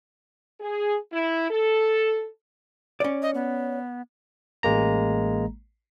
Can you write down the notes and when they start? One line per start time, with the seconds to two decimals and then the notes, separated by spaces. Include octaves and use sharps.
0.60 G#4
1.13 E4
1.50 A4
3.00 C#4 D5
3.22 D#5
3.35 B3
4.63 A1 G#3 A#3 A#5